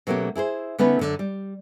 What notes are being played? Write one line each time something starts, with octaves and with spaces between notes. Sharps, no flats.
B2 F#3 A3 A#3 C#4 G4
E4 G#4 B4 C5
D3 A3 B3 C#4 D#4 B4
F#2 D3
G3